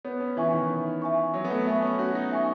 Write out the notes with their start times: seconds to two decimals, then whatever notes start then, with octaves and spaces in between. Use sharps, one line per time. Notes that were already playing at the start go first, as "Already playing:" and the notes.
0.05 B3 C#5
0.20 C#4
0.37 E3 E5 G#5 C#6
0.53 D#3
0.70 C#5
1.02 E5 G#5 C#6
1.34 F#3 C#5
1.45 B3
1.50 A3
1.67 B3 E5 G#5 C#6
1.82 C#4
1.98 F#4 C#5
2.15 D#4
2.31 E5 G#5 C#6